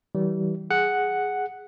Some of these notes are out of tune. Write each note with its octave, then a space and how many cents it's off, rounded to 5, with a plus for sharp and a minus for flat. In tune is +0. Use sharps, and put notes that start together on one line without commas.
E3 -30 G3 -35
G#4 +0 F#5 +0